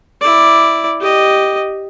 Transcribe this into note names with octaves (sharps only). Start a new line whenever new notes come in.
E4 D5
G4 D#5